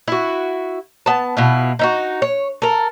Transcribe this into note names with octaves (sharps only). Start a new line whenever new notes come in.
E4 F#4
B3 A5
B2 E4 F4
D#4 E4 F#4
C#5
A4 A#4